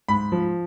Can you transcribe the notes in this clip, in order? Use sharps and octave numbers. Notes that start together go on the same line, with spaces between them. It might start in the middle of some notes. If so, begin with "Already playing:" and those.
G#2 B5
F3